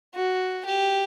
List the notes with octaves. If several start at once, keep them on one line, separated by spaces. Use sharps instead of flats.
F#4
G4